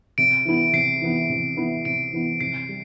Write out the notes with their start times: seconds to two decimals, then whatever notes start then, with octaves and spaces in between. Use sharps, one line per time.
0.18 C3 D7
0.45 E3 B3 E4
0.73 C3 C7
1.01 E3 B3 E4
1.30 C3
1.57 E3 B3 E4
1.85 C3 D7
2.13 E3 B3 E4
2.41 C3 C7
2.69 G3